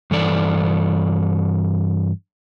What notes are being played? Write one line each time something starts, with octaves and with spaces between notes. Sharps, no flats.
G2 E3 A4 D5